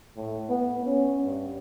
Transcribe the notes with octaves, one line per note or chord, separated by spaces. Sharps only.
A2
B3
C#4
G2